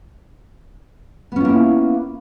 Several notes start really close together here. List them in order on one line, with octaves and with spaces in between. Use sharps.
B3 C#4 F4 A#3 E4